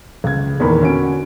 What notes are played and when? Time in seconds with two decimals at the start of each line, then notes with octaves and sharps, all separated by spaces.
0.24 C#2 G#6
0.60 E2 A#2 D#3 A#4 B5
0.82 D3 C#4 F#4 G#5 D7